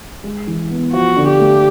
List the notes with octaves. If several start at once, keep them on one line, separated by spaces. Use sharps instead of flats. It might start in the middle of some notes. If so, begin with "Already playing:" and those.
G#3
E3
B3
F3 F#4
D3
G4
A3